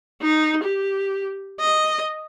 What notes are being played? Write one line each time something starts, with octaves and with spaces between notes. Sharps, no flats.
D#4
G4
D#5